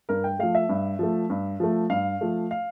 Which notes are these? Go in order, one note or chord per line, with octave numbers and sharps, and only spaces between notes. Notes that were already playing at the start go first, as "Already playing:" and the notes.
G2 A#4
G5
F3 A3 F5
E5
G2
F3 A3
G2
F3 A3
G2 F5
F3 A3
F5